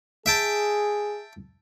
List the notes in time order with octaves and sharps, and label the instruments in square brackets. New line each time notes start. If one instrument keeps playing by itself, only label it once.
[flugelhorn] G#4 [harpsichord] E5 G5 A5